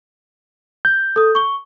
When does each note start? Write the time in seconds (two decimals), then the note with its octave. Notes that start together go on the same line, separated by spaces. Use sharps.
0.85 G6
1.16 A4 D#6
1.35 C#6 G7